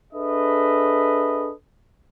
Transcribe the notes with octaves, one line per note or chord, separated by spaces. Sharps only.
D4 G#4 A4 B4 D#5 E5